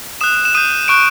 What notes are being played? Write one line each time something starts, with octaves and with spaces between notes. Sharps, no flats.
D#6 F#6 E7
E7
D#6 G6 D#7
C#6 F#6 D7